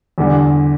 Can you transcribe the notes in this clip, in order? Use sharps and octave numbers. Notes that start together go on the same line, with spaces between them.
E2 D3 G3